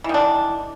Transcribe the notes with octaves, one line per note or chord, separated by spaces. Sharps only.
D#3 E3 D4